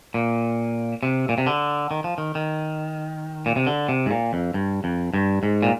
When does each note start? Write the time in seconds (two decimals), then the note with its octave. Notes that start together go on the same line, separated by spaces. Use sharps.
0.14 A#2
1.03 C3
1.29 A#2
1.38 C3
1.47 D3
1.91 D#3
2.04 F3
2.18 D#3
2.35 D#3
3.46 A#2
3.56 C3
3.67 D3
3.89 C3
4.06 G#2
4.11 A#2
4.33 F2
4.54 G2
4.84 F2
5.14 G2
5.43 G#2
5.62 A#2